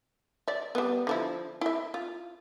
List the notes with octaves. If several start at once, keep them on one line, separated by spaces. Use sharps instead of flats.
D5 E5
G3 B3
D3 F3 E4
E4 E5
F4